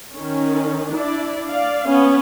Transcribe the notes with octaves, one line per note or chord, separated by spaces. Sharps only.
D#3 C#4
D4 E4 D5
D5 F5
B3 C#4